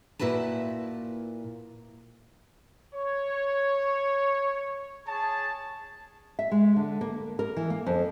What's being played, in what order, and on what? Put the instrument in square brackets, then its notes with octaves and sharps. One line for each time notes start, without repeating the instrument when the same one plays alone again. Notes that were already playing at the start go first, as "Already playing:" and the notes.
[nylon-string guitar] A#2 E4 F#4 B4 A5
[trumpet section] C#5
G#4 C#5 A5
[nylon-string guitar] E5
G#3
D3
A#3
A#4
E3
A#3
F2